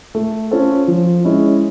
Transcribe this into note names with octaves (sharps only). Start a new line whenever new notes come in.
A3
C#4 F4 A4 C5
F3
G#3 C#4 E4